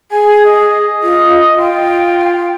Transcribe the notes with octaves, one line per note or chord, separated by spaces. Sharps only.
G#4 G#5
D#5
F4
F4 G5